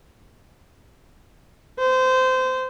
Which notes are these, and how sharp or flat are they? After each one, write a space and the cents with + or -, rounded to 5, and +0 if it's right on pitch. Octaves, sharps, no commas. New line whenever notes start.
C5 -20